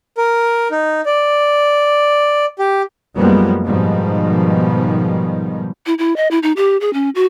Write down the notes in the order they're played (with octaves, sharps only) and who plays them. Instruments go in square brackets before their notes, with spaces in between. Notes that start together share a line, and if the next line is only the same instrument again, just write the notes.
[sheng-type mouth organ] A#4
D#4
D5
G4
[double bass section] F#2 F3 G3 G#3 A#3 B3
G#2 B2 D#3 F3 G3
[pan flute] E4
E4
D#5
E4
D#4
G4
G#4
C#4
F#4